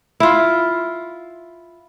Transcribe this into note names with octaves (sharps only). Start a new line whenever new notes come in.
E4 F4